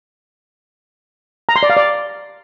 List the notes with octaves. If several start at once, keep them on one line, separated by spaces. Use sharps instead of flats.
A#5
C6
D5
F5
D5